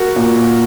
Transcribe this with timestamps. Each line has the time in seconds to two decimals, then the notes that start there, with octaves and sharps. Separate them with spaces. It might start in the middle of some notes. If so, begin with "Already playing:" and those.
Already playing: F#4 A#4
0.16 A#2